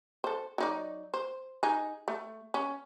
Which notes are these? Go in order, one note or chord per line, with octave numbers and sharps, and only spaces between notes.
A4 C5
F#3 D#4 D5
C5
D#4 G#4
A3
C#4